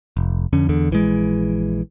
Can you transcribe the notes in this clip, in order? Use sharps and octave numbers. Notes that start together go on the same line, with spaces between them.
F1
F2 D3 C#4
E2 D3
A#1 E3 G#3